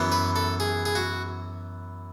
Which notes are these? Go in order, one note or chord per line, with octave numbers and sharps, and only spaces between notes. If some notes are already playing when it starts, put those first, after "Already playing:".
Already playing: F#2 E3 B3
B4
A4
G#4
G#4
F#4